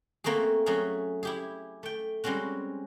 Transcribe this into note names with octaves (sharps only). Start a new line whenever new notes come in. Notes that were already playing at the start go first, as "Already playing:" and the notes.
A3 A#3 C4 F#4 G#4
F#3 A3 C#4 G#4 F5
E4 G4 G#4
A3 G5
G3 G#3 C4 C#4 F#4